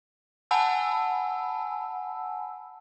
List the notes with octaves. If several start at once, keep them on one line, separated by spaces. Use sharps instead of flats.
F#5 G#5 A5 B5 E6